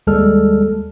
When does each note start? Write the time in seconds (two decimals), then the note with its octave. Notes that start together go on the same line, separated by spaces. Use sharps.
0.07 D#2 G3 G#3 A4 F6